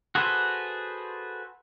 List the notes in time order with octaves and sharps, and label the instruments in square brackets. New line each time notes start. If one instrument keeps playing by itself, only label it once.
[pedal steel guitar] F#4 G#4 A4 B4 C5